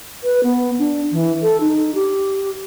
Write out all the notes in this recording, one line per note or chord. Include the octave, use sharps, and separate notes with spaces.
B4
B3
D4
E3
A4
D#4
G4